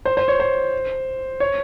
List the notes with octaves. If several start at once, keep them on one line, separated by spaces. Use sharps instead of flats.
C5
C5
C#5
C5
C#5